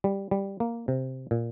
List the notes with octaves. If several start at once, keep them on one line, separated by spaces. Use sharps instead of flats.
G3
G3
A#3
C3
A#2